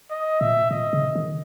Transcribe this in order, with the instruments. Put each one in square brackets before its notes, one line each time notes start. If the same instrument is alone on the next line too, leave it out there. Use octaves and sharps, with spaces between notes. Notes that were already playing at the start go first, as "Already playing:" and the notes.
[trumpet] D#5
[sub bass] A#2 [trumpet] E5
[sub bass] A#2 [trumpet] D#5
[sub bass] C#3
D#3